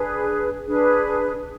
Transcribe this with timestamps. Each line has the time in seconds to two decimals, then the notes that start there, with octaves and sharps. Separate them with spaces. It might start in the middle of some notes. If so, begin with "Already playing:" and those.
Already playing: D4 G#4 B4
0.66 D4 G#4 B4